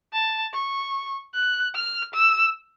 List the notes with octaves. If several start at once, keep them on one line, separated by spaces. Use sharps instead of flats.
A5
C#6
F#6
F6
E6